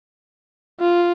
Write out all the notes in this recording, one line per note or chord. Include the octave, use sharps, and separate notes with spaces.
F4